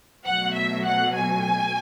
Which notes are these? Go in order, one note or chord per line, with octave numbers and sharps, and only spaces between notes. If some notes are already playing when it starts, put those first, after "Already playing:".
B2 F#3 A3 F#5
E5
F#5
G#5